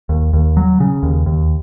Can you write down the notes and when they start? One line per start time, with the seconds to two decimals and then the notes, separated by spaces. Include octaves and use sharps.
0.09 D#2
0.33 D#2
0.57 F#3
0.80 C#3
1.03 D#2
1.26 D#2